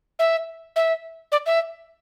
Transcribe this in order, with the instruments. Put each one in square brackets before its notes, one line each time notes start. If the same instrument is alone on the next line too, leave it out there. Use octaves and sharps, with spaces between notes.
[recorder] E5
E5
D5
E5